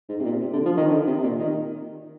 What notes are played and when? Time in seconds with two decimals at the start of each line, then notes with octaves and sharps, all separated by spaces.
0.09 G#2
0.20 C3
0.25 A#2
0.40 C3
0.53 D3
0.66 F3
0.77 D#3
0.91 D3
1.07 C3
1.23 A#2
1.39 D#3